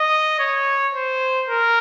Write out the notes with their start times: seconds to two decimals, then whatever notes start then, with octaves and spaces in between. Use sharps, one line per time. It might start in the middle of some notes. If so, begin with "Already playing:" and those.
Already playing: D#5
0.39 C#5
0.94 C5
1.49 A#4